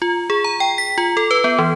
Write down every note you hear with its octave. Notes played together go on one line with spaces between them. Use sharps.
F4
G#4
A#5
G5
B6
F4
A4
B4
B3
E3